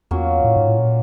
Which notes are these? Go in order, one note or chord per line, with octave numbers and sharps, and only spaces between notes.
E2 F#3 A#3 C#4 F4
A2
G#2
A2
A#2